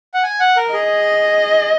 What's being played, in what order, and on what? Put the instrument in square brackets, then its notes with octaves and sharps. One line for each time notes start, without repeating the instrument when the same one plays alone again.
[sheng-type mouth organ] F#5
G#5
F#5
A#4
[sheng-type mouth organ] G#4 [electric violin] D#5